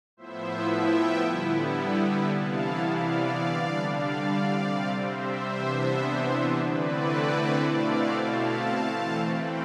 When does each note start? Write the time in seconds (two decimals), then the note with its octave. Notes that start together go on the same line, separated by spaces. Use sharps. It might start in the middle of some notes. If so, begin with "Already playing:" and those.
0.17 A2 F3 B3 E4 C5 E5
0.71 E5 G5
1.24 D3 G3 B3 E4
2.31 C3 E3 B3 E4 F5 A5
2.85 D5 F5
3.39 D3 G3 D4
3.91 D5 F5
4.45 C3 G3 C4
4.99 C5 E5
5.52 C3 E3 B3 D4
6.59 D3 A3 C4 E4 B4 D5
7.66 B2 A3 C4 E4 D5 F5
8.19 F5 A5
8.74 E3 A3 C4
9.26 G5 B5